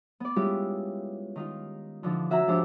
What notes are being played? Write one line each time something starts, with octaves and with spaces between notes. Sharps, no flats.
B3 D5
G3 G#3 C#4 E4 F4 G4
D#3 D#4 F4
D3 E3 F3 D#4
C#4 F#4 E5 F#5 G#5 A#5
G#2 F3 D4 G4 C5 E6